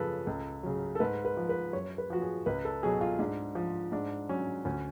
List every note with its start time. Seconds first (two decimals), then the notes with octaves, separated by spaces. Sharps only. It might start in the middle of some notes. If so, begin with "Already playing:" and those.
Already playing: F#2 C#3 F3 A4 B4
0.27 C#2 A4
0.63 C#3 F#3
0.95 A4
1.00 G#2 B4
1.25 B4
1.37 F3
1.49 B4
1.73 F#2 C#5
1.98 B4
2.10 F3 F#4
2.22 G#4
2.46 C#2 B4
2.65 A4
2.83 B2 F#3 G#4
3.01 F4
3.19 G#2 D4
3.55 F3
3.92 G#2 D4
4.29 F#3 C#4
4.65 D2 C#4